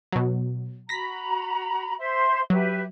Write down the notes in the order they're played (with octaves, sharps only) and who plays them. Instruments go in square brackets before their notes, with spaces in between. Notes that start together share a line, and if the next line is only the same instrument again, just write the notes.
[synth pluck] B2 F#3
[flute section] F#4 A#5 B5 [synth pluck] A#6 B6
[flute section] C5 E5 C6
[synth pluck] F#3 [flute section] G4 B4 E5